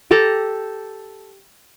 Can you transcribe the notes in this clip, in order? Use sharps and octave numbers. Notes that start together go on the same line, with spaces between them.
G4 A4 A5 A#5